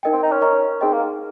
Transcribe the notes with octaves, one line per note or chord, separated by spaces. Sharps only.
D#4 A#4 D#5 G5
C4
D#4
C#4
A#4 D#5 A#5 C#6
C4 D#4 G#4 D#5
A#3